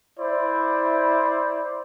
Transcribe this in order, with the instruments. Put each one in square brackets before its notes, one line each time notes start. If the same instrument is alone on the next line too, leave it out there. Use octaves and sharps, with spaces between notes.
[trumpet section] E4 C5 D5